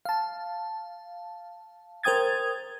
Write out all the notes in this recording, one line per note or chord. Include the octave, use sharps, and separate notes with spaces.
F5 A5
A#4 C5 G5 D#6 G#6 A6